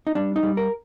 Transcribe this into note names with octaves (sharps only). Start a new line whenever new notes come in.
D#4
G3 D4
D#4
G3
A#4